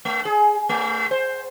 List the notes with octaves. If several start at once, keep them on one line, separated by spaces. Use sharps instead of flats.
A3
G#4
A3
C5